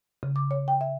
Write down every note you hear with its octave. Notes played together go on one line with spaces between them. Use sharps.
C#3
D6
C#5
G5
E5